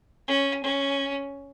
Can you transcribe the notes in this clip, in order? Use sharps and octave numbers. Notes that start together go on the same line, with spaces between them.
C#4
C#4